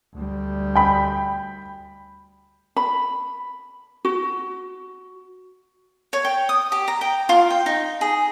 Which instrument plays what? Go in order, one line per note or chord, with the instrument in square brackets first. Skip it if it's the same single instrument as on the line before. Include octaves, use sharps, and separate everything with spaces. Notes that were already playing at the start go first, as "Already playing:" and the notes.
[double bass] D2 G3
[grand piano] G5 B5
[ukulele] B5
F#4
[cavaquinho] C#5
G5
D#6
G4
A#5
G5
F4
G5
D#4
G#4